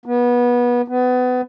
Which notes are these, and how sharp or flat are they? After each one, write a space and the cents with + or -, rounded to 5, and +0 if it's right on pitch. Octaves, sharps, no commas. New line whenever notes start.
B3 -25
B3 +25